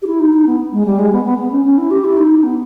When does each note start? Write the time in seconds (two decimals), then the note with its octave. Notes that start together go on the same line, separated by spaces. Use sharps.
0.02 G4
0.06 E4
0.19 D#4
0.33 D#4
0.46 B3
0.72 G#3
0.85 G3
0.99 G#3
1.12 B3
1.25 B3
1.38 B3
1.51 C#4
1.64 C#4
1.77 E4
1.90 G4
2.04 E4
2.17 D#4
2.43 B3